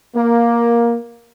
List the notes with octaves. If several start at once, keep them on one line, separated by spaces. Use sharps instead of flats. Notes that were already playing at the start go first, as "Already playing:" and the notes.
A#3